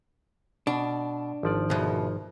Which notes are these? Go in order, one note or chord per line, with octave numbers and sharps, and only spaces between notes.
B2 D4
G#1 F3 D5
D2 B2